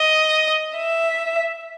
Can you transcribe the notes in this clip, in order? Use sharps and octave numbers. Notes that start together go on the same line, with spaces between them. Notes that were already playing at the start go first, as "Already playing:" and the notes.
Already playing: D#5
E5